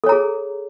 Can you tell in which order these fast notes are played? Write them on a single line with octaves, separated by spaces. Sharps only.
A4 C#5 A#5 G#4